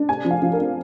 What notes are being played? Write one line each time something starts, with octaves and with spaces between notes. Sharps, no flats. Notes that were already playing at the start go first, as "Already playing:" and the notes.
Already playing: D4
C3 G#5
F3
F5
F3
A#4
C4